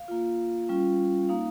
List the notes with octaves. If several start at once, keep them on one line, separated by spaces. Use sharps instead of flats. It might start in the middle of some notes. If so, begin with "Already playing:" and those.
Already playing: F5
A#3 F4
G3 C#4 F4
A#3 D#4 F5